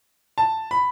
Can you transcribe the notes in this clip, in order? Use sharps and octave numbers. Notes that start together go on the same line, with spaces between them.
A5
B5